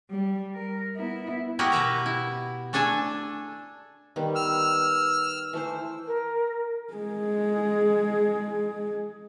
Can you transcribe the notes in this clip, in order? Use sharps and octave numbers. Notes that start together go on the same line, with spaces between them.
G3
A#4
B3 E4
E4 F#4 G4 A#4 D#5
B2 B4 E5 A#5
E4
A3 D4 A4 G#5 A5
D#3 G3 B3
E6 F6
E3 A3 C5
A#4
G#3 G#4